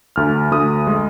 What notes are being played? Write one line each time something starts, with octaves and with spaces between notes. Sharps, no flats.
D2 F6
D2 D#6
G#3